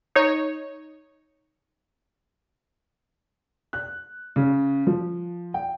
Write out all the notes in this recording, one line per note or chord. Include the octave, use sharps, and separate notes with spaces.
D#4 C#5
F#6
C#3
F3
G5